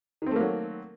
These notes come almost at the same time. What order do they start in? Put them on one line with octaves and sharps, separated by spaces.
D#3 C4 A3 A#3 F#3